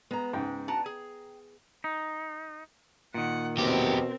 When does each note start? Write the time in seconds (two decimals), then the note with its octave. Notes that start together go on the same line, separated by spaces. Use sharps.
0.11 G#3 B3 A#5
0.33 C#2 G#2 G5
0.68 D4 F#4 A5 A#5
0.86 G#4
1.84 D#4
3.14 A#2 D#3 F#5
3.58 E2 B2 C4 G4 A#4